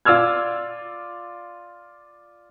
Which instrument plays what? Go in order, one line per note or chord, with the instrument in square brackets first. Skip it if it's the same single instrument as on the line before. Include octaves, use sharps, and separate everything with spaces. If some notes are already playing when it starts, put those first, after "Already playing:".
[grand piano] F4 D5 E6 F6 G#6